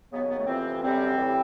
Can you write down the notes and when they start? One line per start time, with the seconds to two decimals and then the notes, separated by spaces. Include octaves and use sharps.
0.13 D#2 C#3 F#3 B3
0.30 B3
0.38 A3
0.47 F2 C3 E3 C4
0.82 F#2 D3 G3 C4
1.17 A2 E3 G3